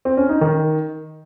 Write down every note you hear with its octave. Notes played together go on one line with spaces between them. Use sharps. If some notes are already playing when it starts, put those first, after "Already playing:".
C4
C#4
D#4
D#3